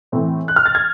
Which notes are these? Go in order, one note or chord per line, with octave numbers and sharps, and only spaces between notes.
A2 E3 A3 C4
F#6
F6
A6
G#6